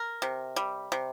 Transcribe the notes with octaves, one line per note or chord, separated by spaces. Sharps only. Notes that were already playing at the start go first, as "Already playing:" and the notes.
Already playing: A#4
C3
G3
C3